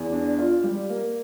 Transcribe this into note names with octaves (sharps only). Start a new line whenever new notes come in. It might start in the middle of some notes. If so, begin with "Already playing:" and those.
Already playing: E2
D4
F4
G3
A#3